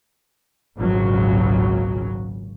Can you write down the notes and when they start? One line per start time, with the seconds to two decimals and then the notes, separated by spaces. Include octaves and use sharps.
0.77 G#1 C#2 A#2 C#3 F#3